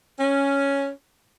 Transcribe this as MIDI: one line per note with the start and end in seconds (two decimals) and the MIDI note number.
0.19 0.92 61